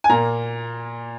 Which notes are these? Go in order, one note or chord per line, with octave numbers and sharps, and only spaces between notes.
G#5
A#2 A#3 A#5